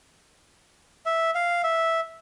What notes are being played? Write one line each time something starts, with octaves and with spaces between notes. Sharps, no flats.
E5
F5
E5